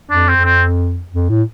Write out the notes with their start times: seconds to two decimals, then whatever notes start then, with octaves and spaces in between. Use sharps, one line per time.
0.10 F2 D4
0.28 C4
0.36 F2
0.45 C4
1.12 F2
1.30 A2